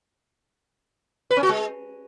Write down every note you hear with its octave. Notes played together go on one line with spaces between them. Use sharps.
B4
C#4
F#4
G#3